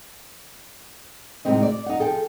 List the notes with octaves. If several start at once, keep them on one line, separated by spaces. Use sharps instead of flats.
A2 C3 G#3 C4 D#4
D5
D#4 F#5
F3 G#4 A4 G5